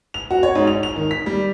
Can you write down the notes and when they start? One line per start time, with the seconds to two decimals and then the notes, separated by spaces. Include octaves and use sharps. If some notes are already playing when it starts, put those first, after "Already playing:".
0.14 F7
0.31 F#4
0.43 C#5
0.55 G#2
0.67 F7
0.83 F7
0.96 D#3
1.11 B6
1.26 G3